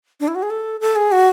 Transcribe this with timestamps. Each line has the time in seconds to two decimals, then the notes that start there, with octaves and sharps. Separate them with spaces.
0.20 D4
0.28 E4
0.35 F#4
0.42 G#4
0.50 A4
0.81 A4
0.96 G#4
1.12 F#4